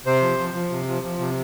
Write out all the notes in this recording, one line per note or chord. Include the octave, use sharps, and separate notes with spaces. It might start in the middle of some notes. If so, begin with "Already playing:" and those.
C3 C5
F3
F3
F3
C3
F3
F3
C3